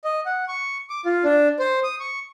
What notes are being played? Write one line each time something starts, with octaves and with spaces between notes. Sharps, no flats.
D#5
F#5
C#6
D6
F4
D4
C5
D#6
C#6